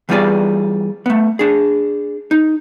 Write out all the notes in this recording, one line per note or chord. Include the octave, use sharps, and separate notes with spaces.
E3 G3 B3 F4 G#4 D5
A3 B3
D4 G#4
D#4